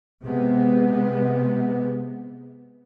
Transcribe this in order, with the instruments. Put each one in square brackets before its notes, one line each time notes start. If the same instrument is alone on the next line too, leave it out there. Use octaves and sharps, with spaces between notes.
[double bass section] C3 G#3 B3